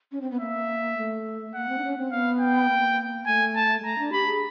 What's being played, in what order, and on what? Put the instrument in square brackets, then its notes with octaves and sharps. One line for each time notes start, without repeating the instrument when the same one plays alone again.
[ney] C#4
C4
B3
[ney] A#3 [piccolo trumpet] E5
[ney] A3
[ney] A#3 [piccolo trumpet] F#5
[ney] C4
D4
C#4
C4
[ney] B3 [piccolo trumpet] F5
[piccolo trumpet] G5
[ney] A#3
[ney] A3 [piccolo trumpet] G#5
[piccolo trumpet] A5
[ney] G#3
[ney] A3 [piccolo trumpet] A#5
[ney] D4
[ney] G4 [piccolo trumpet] B5
[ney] G#4